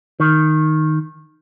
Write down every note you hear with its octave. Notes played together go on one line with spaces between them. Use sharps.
D#3